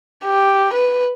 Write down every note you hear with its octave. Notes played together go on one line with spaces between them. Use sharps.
G4
B4